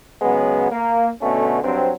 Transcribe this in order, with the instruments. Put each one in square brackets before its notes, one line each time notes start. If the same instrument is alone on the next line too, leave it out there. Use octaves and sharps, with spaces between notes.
[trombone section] C#3 F#3 G#3 B3
A#3
B2 D3 A3 B3 C#4
G2 F#3 C4